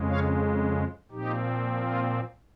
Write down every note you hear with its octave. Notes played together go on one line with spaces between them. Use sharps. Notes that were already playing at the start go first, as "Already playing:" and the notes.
Already playing: F2 C#3 G#3
C#5 F5
A#2 F3 C4 D#4 G4
F4